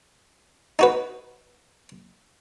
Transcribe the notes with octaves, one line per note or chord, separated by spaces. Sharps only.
D#4 F#4 B4